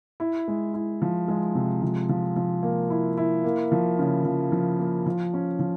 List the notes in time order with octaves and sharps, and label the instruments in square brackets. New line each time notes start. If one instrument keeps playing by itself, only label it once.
[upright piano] E4
G#3
E4
F3
G#3
C3
F3
F3
F3
A#3
E4
E4
A#3
F3
C#3
F3
F3
A#3
F3
C#4
F3